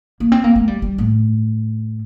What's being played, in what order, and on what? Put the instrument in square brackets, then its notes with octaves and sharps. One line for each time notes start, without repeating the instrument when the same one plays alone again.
[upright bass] A#3
C4
A#3
A3
G3
G3
A2